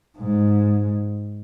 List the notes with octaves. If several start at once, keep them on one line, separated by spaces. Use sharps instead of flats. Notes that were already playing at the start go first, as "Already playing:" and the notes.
G#2